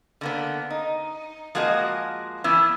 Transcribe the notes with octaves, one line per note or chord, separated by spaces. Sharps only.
D3 A#3 B3
D#4
F3 G#3 A#3 F#4 G#4 D#5
E3 B3 E4